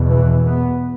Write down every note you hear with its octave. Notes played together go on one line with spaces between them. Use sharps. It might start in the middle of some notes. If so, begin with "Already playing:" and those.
Already playing: E2 B2
E3
B3